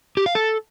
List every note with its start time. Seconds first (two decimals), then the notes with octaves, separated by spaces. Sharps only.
0.17 G4
0.26 F5
0.35 A4